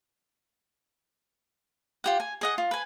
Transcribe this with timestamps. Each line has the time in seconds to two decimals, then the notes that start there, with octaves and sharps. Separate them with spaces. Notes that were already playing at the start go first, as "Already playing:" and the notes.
2.04 F4 G4 F#5
2.20 G#5
2.41 G#4 D#5 F#5
2.58 F4
2.71 B4 G#5